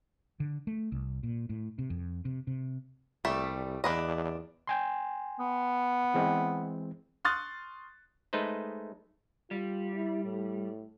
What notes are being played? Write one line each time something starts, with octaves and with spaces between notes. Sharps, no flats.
D3
A3
C2
A#2
A2
C3
F2
C3
C3
C2 G3 A3 E5
E2 D4 B4 D#5
G5 G#5 C6
B3
E3 G#3 C4
C6 C#6 D#6 F6 F#6 A6
G#3 A3 D#4 B4 C5
G3 F4
E4
A2